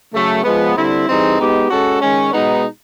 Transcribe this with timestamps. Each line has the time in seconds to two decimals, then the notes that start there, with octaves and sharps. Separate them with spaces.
0.12 C#3 F#3 A3
0.43 F3 G#3 B3
0.76 D3 G3 C4 E4
1.07 E3 G3 C4 D#4 G#4
1.39 G#3 B3 D#4 G4
1.69 G#3 C#4 F#4 A4
2.01 D#3 G#3 C#4
2.33 B2 G#3 B3 D#4